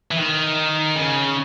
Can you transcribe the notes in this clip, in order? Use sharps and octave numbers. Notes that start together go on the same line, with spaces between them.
E3
D#3
C#3